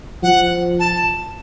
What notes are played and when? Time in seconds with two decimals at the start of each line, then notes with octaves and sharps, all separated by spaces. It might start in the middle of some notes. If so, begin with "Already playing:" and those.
0.23 F3 F#5
0.79 A5